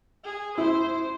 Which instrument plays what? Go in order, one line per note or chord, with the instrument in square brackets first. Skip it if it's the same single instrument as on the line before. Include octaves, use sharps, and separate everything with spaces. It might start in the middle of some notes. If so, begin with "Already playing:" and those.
[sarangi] G#4
[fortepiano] E4 [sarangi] C5